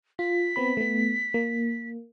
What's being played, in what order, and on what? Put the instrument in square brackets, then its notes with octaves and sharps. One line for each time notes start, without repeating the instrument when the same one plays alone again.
[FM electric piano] F4 [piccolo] B6
[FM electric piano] B3 C4 B5
A3 B3
A#3